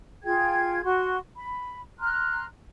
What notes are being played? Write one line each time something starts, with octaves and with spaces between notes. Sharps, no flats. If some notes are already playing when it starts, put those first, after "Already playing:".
F4 G#4 G5 G#6
F#4 C6
B5
A#5 C6 F6 F#6